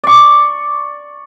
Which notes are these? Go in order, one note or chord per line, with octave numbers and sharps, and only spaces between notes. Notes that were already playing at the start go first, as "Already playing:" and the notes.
D5 C#6